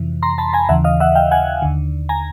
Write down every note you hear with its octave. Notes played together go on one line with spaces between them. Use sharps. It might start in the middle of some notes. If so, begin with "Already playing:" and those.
Already playing: F2 C3 E3
A#5 C6
A5 B5
G#5 A#5
D#2 C#3 E3 E5 F#5
D#5 F5
E5 F#5
F5 G5
F#5 G#5
D#2 D3
G#5 A#5